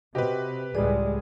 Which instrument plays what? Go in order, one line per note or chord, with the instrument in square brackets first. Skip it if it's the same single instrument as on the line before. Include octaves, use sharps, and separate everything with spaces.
[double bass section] C3 [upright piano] C4 F#4 D#5 [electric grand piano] G4 B4
[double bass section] C#2 A2 G#3 [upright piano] G3 G#4 [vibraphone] D5